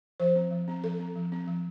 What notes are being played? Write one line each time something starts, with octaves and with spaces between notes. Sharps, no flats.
F3 C5
C4
F3
C4
F3 A4
C4
F3
C4
F3